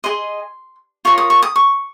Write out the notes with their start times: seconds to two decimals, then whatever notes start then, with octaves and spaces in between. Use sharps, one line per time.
0.04 G#4 D#5 C6
1.05 F4 A#4 C#5 C#6
1.18 D#6
1.30 C#6
1.42 D#6
1.56 C#6